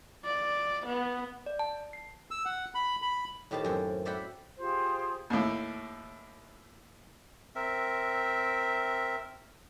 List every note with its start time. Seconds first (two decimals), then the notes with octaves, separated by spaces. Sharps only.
0.25 D5
0.86 B3
1.46 D5
1.59 A5
1.93 C7
2.31 E6
2.45 F#5
2.75 B5
3.02 B5
3.51 A2 D#3 G4 C5 A5
3.64 F#2 C4
4.05 C5 D5 E5 F#5 G5 B5
4.58 F4 G4 G#4 C5
5.30 D#2 A2
7.55 C4 A#4 E5